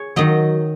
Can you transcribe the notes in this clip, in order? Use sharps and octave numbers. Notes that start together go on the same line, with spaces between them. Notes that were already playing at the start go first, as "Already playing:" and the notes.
Already playing: G#4 C#5
D#3 F#3 D#5